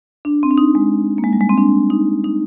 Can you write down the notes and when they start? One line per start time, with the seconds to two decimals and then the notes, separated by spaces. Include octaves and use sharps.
0.25 D4
0.43 C4
0.51 D4
0.58 D#4
0.75 G#3
1.18 A#3
1.24 G#3
1.33 G3
1.41 G#3
1.50 C4
1.57 D4
1.90 D#4
2.24 D#4